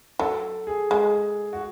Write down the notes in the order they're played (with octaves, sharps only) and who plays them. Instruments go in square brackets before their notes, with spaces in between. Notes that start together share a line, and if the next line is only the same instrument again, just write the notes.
[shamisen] F#3 [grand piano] A4
[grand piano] G#4
[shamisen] G#3 [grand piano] G#4
[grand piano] F#4